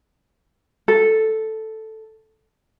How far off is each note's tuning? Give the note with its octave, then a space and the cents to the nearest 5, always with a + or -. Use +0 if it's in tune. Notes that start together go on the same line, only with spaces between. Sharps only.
A4 +0